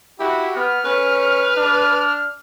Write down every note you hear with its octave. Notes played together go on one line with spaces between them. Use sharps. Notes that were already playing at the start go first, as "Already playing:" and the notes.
E4 F#4 G4
B3 F6
C#4 B4
D4